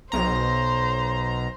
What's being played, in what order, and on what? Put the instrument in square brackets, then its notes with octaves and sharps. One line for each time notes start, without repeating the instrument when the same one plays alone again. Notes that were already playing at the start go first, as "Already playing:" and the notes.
[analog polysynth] B1 A#5 [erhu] C5